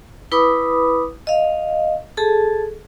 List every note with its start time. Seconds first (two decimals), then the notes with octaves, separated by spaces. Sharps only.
0.32 E4 B4 B5 D6 D#6
1.27 D#5 F5
2.17 G#4 A4 A5